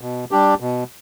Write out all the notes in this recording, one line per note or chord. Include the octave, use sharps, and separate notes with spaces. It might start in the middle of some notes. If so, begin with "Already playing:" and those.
B2
G3 D4 G4
B2